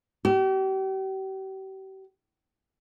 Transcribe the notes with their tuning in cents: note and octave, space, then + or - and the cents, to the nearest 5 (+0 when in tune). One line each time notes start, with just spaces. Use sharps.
G4 -40